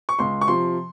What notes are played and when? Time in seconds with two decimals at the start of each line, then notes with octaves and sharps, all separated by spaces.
0.09 C#6
0.19 C#2 C6
0.41 C#6
0.47 C3 F3 C6